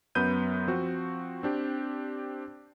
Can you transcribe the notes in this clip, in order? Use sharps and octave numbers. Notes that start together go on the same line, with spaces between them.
F#2 F#3 B3 B5 G6 D#7
F3 C4 F#4
C4 D4 G4